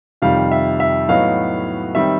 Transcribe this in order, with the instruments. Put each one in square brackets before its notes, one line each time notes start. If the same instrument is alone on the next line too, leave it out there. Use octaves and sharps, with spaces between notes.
[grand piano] F2 C3 D#3 G3 F5
E5
E5
A2 F#3 B3 D#4 F5
D#3 G3 C4 E5